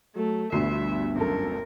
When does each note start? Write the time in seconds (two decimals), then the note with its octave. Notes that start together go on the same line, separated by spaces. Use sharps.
0.16 F#3 A3
0.52 G1 D2 G2 B2 E5 C6 C7
1.16 G#1 F#2 A4 A#4